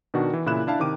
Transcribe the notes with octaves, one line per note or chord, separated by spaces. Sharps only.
B2 D#3 D4 F#4
E3
A#2 C#3 E4 B5 F#6 E7
D4 E4 F5 A5
C3 D#3 D6 D#7